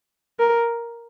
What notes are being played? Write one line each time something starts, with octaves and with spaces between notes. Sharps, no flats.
A#4